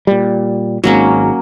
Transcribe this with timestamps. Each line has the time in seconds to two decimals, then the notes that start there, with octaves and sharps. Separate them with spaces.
0.07 A#2 G3
0.84 G#1 G#2 F#3 A#3 C#4